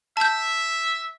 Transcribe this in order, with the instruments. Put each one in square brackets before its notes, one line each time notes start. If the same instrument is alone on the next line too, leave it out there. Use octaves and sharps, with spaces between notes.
[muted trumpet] E5 [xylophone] A5 G6